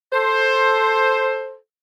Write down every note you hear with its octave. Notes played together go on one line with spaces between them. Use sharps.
A4 C5